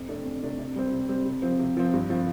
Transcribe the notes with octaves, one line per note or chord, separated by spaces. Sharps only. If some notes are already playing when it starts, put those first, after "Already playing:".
Already playing: F2
C3 A3 D4
F2
C3 A3 D4
C3
G3 C4
C3
G3 C4
C3
F3 C4
C3
F3 C4
G2
F3 C4